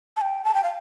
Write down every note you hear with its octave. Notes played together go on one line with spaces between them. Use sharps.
A5
G5
A5
G5
F5